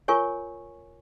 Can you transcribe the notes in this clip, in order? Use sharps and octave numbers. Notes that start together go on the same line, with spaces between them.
F4 A#4 C#5 G#5 C#6